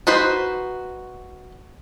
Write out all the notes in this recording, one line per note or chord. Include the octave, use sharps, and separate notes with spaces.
D#4 F#4 B4 C5